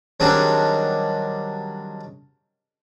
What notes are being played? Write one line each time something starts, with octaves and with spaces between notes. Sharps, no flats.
D#3 F#3 G3 C4 D4 G#4